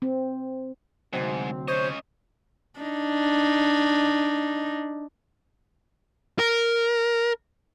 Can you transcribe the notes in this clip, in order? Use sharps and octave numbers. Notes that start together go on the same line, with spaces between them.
C4
D2 G#2 C3 F#3 C4
C#4 C5 C#5 D#5
D4 D#4
A#4